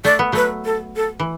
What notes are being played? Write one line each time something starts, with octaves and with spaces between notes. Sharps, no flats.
A3 D5
B3
F#3 A3 B4
A4
A4
E3